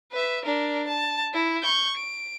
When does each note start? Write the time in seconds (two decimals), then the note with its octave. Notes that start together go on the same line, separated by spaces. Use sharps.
0.12 B4 E5
0.45 D4 A#4
0.87 A5
1.33 E4
1.63 C#6 G6
1.97 D7